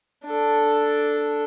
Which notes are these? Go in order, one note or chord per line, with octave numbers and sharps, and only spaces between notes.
D4 A4